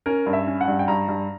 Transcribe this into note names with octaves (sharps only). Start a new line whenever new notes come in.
C#4 A#4
G2
E5
C#4
F#5
G2
G5
G2 A#5
G2